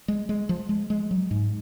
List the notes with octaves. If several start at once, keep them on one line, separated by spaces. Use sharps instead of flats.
G#3
G#3
F3
G#3
G#3
F#3
G#2